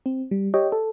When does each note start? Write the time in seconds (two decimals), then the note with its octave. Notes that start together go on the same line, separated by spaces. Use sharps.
0.06 C4
0.31 G3
0.54 G4 C#5 D#5 G5
0.72 A4